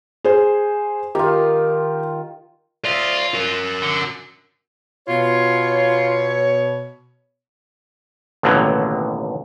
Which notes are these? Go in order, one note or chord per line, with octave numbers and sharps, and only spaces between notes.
G#4 C5
D#3 F4 G4
F4 D5 E5
F#4 A#4
D3
B2 F4 C#5
A1 D#2 B2 D3 F#3